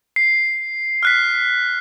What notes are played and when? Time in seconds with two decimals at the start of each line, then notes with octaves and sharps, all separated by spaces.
0.16 C7
1.03 F6 F#6 B6